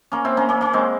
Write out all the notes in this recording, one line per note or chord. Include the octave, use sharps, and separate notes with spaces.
A#3 C#4
C4 E4
A#3 C#4
A#3 C#4
A#3 C#4
G#3 C4